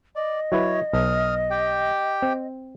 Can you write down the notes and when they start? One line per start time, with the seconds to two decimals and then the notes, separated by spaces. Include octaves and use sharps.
0.16 D5 D#5
0.52 F#3 E4 B4 C#5
0.93 B1 D#6 F6
1.50 G4 G5
2.22 C4